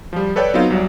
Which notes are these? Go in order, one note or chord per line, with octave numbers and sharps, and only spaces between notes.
F3 G3
A4 B4 C#5 D5 G5
F#3 B3 C4 D#4 F4
C2 F#3 D5